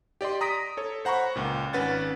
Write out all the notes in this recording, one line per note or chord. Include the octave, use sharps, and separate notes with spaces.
G4 D5 D#5 C6
A#5 D#6 A#6 B6 D7
A4 C#5
C5 F#5 A#5 B5 C#6
C#2 A#2
G#1 C#4 B4 F#5 A6